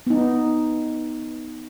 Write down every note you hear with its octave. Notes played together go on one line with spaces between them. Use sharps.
B3 D#4